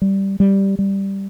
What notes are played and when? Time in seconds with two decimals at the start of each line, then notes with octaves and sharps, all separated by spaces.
0.02 G3
0.40 G3
0.79 G3